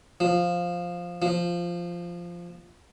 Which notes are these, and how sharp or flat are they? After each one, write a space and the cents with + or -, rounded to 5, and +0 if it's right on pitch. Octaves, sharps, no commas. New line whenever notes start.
F3 +5
F3 -5